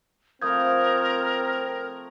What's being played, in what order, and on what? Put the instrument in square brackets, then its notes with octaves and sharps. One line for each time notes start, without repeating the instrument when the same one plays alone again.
[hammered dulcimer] F3 A3 B5 [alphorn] C4 [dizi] A#4 [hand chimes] D#6 G6 G#6